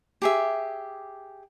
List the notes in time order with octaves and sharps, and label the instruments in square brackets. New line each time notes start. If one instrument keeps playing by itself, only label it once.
[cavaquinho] G4 G#4 E5